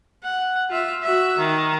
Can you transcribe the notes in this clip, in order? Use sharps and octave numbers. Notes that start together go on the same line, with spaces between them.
F#5
F4 E5
F#4 E5
D#3